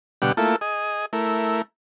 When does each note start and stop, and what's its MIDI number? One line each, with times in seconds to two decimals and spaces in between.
0.22 0.32 47
0.22 0.32 50
0.22 0.32 55
0.22 0.32 67
0.22 0.32 78
0.37 0.56 57
0.37 0.56 58
0.37 0.56 64
0.37 0.56 65
0.37 0.56 69
0.61 1.06 68
0.61 1.06 75
1.13 1.62 57
1.13 1.62 64
1.13 1.62 70